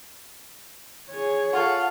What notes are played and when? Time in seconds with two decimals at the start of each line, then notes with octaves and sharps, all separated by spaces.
1.11 G#4 C#5
1.53 F4 A4 F#5 C#6